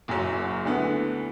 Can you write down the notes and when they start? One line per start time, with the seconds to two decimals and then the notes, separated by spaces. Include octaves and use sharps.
0.08 F#1 F#2 F#3
0.65 D2 D3 B3 E4